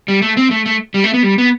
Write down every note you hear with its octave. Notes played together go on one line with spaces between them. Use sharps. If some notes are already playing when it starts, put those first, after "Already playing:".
G3
A3
C4
A3
A3
G3
A3
B3
G3
B3